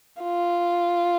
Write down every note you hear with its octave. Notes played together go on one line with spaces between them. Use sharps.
F4